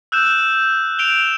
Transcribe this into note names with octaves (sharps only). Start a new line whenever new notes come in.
E6 F#6 G6 E7
D7 F7 G7